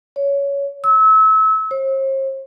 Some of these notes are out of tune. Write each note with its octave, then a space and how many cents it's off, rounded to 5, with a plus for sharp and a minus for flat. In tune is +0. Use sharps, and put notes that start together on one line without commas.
C#5 +15
E6 -30
C5 +45